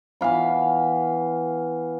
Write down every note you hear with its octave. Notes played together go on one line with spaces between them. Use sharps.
E3 B3 F5 B5